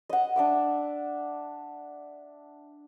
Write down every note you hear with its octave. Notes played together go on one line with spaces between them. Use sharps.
D#5 F#5
D4 E5 D6